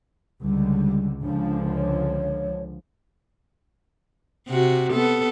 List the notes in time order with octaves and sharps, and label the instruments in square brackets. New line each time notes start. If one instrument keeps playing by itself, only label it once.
[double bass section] C#2 D3 [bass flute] G3
[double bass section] C#2 D3 F3 [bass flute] D4
[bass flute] C#5
[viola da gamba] C3 F#4
B3 A4